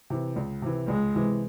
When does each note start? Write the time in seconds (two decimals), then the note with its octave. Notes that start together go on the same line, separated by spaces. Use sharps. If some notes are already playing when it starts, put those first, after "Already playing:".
0.10 C3 E3
0.36 C#2
0.62 C3 E3
0.88 C#2 G#3
1.15 C3 E3